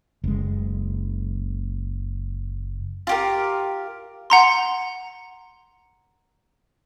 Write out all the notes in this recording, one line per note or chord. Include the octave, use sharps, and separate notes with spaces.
F#1 G#3
F4 G4 A#4
F#5 A#5 C6